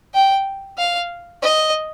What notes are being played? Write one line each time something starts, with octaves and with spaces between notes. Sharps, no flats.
G5
F5
D#5